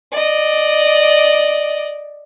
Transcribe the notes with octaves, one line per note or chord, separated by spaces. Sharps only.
D5 D#5